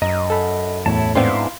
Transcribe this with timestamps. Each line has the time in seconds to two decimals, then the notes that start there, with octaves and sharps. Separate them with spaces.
0.02 F#2 D#5 A#5
0.30 A4 B5
0.86 E2 A2 E4 C#5 A5
1.15 G#2 B3 C4 D4 E4 F5 C6